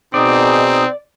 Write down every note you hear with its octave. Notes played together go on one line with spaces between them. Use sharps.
B2 C4 D#4 G#4 D5